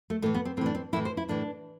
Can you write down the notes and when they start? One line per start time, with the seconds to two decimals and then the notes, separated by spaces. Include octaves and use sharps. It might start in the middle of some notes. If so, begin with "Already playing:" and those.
0.10 A3
0.22 A2 E3 A3
0.35 B3
0.45 C4
0.57 A2 C4
0.61 E3 D4
0.75 C4
0.93 A2 E3 E4
1.05 C5
1.17 E4
1.29 A2 E3 D4